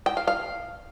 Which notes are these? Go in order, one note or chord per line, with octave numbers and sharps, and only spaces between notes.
G5
F5
F5